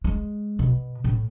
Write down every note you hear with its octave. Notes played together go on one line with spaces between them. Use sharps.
G#3
B2
A2